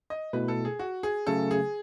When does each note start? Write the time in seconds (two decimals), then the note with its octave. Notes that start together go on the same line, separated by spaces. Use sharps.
0.10 D#5
0.33 B2 A3 E4 B4
0.48 A4
0.65 G#4
0.79 F#4
1.03 G#4
1.27 C#3 F#3 A3 C#4 A4
1.51 G#4